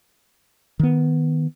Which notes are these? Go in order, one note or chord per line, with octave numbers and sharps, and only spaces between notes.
D#3 B3